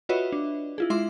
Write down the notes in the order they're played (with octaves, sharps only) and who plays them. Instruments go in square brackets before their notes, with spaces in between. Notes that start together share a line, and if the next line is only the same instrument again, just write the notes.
[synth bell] F4 F#4 B4 C#5 D#5 E5
D4
E4 F4 G#4
G#3 E4 F4 E5 C6 D6